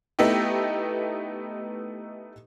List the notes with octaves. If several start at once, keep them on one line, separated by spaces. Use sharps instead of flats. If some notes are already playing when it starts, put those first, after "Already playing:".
A3 B3 D#4 E4 G4